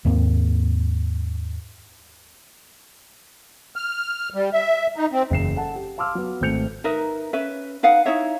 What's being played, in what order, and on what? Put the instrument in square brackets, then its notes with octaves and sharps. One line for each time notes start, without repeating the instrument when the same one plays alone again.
[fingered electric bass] D#2 G#2 A#3 C4
[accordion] F6
G3
E5
D#4
C4
[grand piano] F#1 E2 C7 E7
A4 F#5 A5
G4
F5 A5 C6 D6 E6 F6
F#3 B3
G#1 A3 C4 G6 C#7 F7
[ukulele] D#4 A#4 B4 E5
C#4 B4 E5
D#4 B4 F5 F#5
D#4 E4 C#5 E5